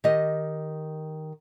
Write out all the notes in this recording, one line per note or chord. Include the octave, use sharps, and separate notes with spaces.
D#3 G4 D#5